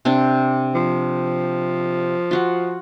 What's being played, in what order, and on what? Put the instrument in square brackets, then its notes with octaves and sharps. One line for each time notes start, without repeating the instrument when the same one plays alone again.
[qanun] C3 C4 D4
[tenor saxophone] F3
[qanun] F4 F#4 F#5